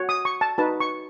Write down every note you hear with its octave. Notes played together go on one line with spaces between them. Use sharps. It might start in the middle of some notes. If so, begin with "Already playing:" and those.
Already playing: F#4 C#5
D#6
C#6
A5
D#4 F#4 B4 A5
C#6